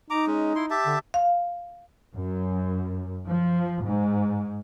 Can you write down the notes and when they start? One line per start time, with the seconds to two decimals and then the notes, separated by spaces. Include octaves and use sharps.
0.10 D#4 A#5 D6
0.27 G#3 C#4
0.55 E4 C6
0.70 G4 E5 A5
0.86 D3
1.14 F5
2.15 F#2
3.27 F3
3.84 G#2